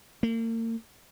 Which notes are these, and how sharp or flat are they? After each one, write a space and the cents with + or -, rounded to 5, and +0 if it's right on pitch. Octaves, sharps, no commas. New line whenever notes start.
A#3 -40